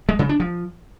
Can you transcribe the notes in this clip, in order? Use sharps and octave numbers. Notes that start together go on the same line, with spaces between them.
G#3
C#3
D4
F3